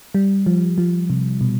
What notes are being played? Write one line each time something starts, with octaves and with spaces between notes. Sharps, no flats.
G3
F3
F3
C3
B2